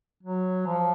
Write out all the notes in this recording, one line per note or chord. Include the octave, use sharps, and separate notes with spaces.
F#3
F3